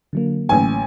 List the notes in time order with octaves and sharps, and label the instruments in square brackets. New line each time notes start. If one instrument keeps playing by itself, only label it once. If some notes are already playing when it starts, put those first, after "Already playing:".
[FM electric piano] D3 F#3 A#3
[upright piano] A1 G#5